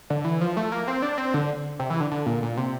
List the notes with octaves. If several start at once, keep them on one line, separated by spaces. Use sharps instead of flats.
D3
E3
F3
A3
A#3
C4
D4
C4
D3
C3
E3
D3
D3
A#2
A#2
C3